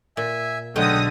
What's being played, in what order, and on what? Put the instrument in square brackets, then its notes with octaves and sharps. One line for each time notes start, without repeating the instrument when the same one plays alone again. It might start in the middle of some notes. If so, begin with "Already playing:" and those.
[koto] A#2 [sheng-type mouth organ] E5 G#5
[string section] B1 D#6 A#6 [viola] D3 [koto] F#3 G#3 A3 [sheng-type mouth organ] G5